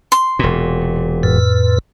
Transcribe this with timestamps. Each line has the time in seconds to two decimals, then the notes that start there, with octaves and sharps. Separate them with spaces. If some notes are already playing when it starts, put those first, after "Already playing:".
0.12 C6
0.39 E1 A#2
1.23 F2 A2 B4